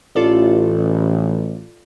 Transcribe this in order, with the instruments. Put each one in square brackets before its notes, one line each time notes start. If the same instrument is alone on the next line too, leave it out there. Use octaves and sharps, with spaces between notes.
[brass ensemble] A1 [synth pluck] F4 A4 D5